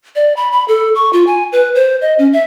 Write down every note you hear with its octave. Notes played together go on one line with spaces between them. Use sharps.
D5
B5
B5
A4
C#6
F4
G#5
B4
C5
D#5
C#4
E5